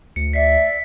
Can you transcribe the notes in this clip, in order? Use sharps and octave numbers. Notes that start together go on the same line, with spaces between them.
D2 C#7
D5 E5 B6 C7